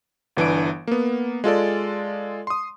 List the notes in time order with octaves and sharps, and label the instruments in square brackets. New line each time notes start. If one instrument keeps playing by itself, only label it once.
[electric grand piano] G1 E3 D4 D7
A#3 B3
G#3 F4 A4 D5
C6 D#6